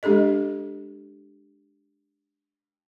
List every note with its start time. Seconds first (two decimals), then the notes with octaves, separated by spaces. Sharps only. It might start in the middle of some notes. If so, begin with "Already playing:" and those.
0.03 G#3 D4 G4 A4 D#5